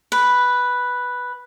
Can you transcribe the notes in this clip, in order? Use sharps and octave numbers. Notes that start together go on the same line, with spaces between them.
B4